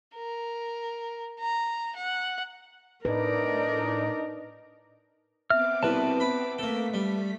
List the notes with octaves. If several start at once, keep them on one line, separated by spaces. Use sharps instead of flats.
A#4
A#5
F#5
A2 D4 D#4 A#4 B4 D5
B3 C4 E5 D6 F6
C2 B2 B4 A5
B5
A3 A#3 A4 B6
G3